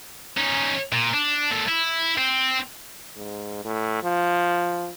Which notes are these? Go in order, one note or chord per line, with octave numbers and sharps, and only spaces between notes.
C#4 D#4
A#2
D4
A#2 A4
E4
C4
G#2
A2
F3